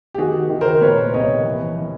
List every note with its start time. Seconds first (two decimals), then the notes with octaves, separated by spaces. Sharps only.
0.15 G4
0.18 D#3 F#4 G#4
0.50 D#3
0.61 A#4 C5
0.81 A#2 B4 C#5
1.14 C2 C#5 D#5
1.44 E3
1.77 E3